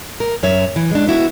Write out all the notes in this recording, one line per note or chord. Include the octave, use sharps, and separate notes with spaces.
A#4
F#2 C#5 E5
E3
G#3 D4
B3 E4 F#4